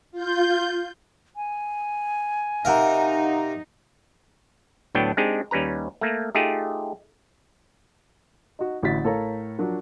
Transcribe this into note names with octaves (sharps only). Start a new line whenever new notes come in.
F4 G6
G#5
C3 D#4 A#4 F5 F#5 A#5
D2 A2 F#3 B3 D4 G5
G#3 C4 D4 D#4 G4 G#4
D#2 G3 C#4 B4 A#5
A3 A#3
A3 D#4 F4 G4 G#4
D#4 F#4
A1 D3 E4 F#4 A6 B6
A2 A4 A#4 C#5 F5 A#5
F3 F#3 D4 F#4 A#4